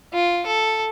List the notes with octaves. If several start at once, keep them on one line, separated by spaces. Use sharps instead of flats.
F4
A4